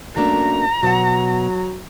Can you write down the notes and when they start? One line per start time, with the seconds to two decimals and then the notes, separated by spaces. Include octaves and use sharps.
0.17 F#2 A3 A#3 D4 A#5
0.83 B2 F#3 F#5